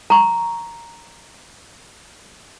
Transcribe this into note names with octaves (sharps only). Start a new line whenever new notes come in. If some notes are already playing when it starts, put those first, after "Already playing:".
A#5 C#6